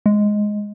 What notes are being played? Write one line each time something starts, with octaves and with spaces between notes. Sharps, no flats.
G#3